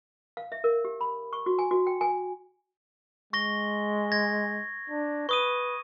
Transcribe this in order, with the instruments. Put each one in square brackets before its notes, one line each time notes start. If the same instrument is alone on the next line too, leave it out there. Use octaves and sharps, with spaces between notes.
[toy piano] F5
E5
A#4
G4
B5
C#6
F#4
G#5
F#4
G5
G#5
[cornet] G#3 [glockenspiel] C#6 A#6 G7
[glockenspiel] G#6 A#6
[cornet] D4
[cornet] B4 [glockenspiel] C#6 D#6 D#7